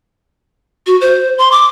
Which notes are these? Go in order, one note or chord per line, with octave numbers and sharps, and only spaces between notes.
F#4
C5
C6
D6